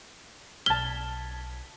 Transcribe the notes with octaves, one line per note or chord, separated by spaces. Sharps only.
B1 A5 F6 G#6 B6 G7